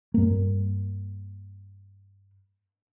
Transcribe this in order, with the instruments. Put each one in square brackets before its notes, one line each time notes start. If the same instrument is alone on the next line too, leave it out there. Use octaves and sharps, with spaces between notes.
[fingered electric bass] G2 A#3